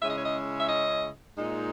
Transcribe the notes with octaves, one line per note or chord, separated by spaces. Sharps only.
C#3 G#3 C#4 E4 E5
D#5
C#5
D#5
E5
D#5
A#2 G#3 D#4